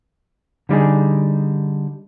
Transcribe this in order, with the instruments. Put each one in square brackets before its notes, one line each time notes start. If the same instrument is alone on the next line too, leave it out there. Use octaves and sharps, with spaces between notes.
[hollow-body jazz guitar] D3 G3 D#4 G#4